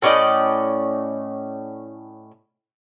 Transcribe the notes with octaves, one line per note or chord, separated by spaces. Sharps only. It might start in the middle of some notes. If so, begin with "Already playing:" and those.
A2 C#4 D5 D#5